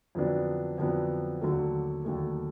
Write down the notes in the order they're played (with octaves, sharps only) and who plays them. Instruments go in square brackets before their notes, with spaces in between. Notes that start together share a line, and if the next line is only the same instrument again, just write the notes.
[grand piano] F2 D3 F#3 B3 D4
F2 D3 F#3 B3 D4
D#2 D3 F#3 A3
D#2 D3 F#3 A3